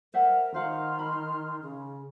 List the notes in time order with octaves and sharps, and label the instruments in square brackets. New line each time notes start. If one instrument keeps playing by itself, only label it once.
[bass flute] A#4 [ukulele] C5 E5 F#5
[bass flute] D#3 [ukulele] C5 F5 F#5 [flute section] A#5 C6 F6
[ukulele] B5
[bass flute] C#3